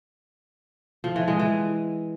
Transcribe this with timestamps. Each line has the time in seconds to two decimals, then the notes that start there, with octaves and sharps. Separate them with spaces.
1.04 F3
1.16 E3
1.28 G#3
1.39 E3